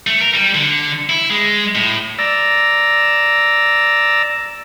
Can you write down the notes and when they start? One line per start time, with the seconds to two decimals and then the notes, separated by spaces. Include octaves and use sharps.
0.07 A3
0.21 A#4
0.34 G3
0.54 D3
1.09 E4
1.30 G#3
1.75 A2
2.19 D5 A#5 E6